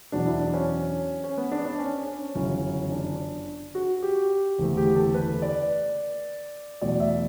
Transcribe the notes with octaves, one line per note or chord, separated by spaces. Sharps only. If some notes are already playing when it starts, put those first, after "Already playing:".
E2 B2 F#3 D4
E4
D4
C#4
C#4
B3
D4
D4
C#4
C#4
G1 F#2 C#3 E3 C#4
D4
F#4
G4
F#1 E2 D3 A3
G4
A4
B4
D5
E2 B2 F#3 A3 D5
E5